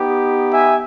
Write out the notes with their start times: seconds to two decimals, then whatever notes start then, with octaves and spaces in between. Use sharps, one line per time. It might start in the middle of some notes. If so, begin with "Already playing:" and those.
Already playing: B3 D#4 G4
0.53 E5 G#5